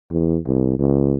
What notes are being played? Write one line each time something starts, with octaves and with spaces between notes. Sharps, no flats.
E2
C2
C#2